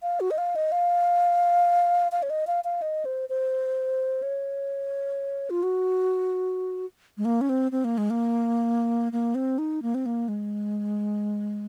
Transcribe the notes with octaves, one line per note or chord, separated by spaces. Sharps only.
F5
F#4
D#5
F5
D#5
F5
F5
C#5
D#5
F5
F5
D#5
C5
C5
C#5
F4
F#4
G#3
A#3
C#4
C4
C4
A#3
G#3
A#3
A#3
C4
D#4
A#3
C4
A#3
G#3